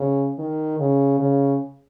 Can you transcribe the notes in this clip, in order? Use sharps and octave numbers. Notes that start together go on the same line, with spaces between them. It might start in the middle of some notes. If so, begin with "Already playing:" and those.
Already playing: C#3
D#3
C#3
C#3